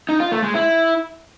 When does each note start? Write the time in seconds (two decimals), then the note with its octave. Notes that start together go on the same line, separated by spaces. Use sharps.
0.09 D#4
0.20 F4
0.32 A3
0.43 G#3
0.55 E4